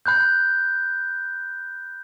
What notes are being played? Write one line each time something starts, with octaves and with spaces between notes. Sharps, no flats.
B5 F#6 G6